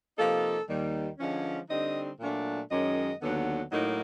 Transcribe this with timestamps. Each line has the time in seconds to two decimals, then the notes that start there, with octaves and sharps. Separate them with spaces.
0.17 C3 F3 A#3 D#4 A4
0.68 D#2 D#3 G3
1.18 D3 F3 G#3 C#4
1.69 D3 G3 C4 D#4 D#5
2.20 A#2 F#3 A3 D4
2.70 F#2 D#3 G#3 C#4 D#5
3.21 D#2 D3 F#3 B3
3.72 A2 F#3 A#3 D#4